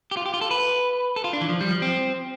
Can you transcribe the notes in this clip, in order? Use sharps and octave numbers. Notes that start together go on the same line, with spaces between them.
G4
F4
G4
F4
A4
B4
A4
F4
D4
E3
F3
G3
F3
C4